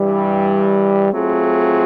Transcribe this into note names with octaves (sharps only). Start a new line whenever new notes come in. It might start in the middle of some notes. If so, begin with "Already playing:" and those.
Already playing: G2 E3 G3
F#3 A3 C4 F4 G#4